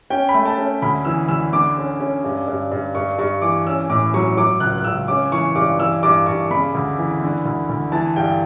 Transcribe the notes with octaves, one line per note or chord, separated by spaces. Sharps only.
C#4 G5
B5
A3
A5
C#4
D2 B5
E3 E6
D2 E6
D3 D6
C#4
C#4
G2
G2
G2
G2 C#6
G2 C#6
E3 D6
C#4 E6
A2 D6
F#3 C#6
F#3 D6
C#2 F#6
F#6
C#2 E6
C#4 D6
E3 C#6
G2 D6
E3 E6
G2 D6
G2 C#6
C#3 B5
D2
E3
D3
D2
D2
E3 A5
G2 G5